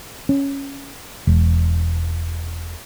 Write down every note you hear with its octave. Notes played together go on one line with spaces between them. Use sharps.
C#4
E1